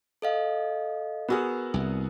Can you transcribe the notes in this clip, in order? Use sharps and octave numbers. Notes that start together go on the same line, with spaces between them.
A4 D#5 F5
B3 F#4 G#4 A#4 E6 F6
C2